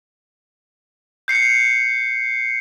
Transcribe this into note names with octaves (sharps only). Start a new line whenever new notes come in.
G6 C7 C#7